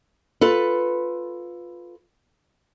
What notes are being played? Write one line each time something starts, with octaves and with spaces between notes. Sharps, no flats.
F4 A4 B4